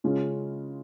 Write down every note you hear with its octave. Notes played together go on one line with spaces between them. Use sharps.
C#3 G#3 C#4 F4